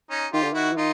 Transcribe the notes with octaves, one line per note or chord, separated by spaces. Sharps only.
C#4 D#4
D#3 F4 G4
D3
D#3 E4 F#4
E3
D#3 D#4 F4